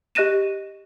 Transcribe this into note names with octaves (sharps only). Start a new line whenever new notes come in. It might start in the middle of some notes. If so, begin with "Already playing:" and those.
G4 D#5 F#6 A#6 D#7 E7